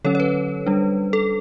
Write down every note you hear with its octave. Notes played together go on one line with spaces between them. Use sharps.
D3 F#3 C#4 A4 C#5
C#5
B4
G3 D4
A4